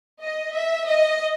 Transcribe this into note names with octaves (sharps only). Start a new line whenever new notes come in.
D#5
E5
D#5